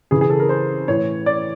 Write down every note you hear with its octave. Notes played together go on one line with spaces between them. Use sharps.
C#3 E3 G#4
G#4
A4
A#4
C5
A2 E3 C#5
D5